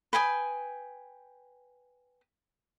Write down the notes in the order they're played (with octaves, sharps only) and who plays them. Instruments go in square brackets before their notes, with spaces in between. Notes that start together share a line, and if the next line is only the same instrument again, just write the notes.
[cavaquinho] B4 G5 G#5 D#6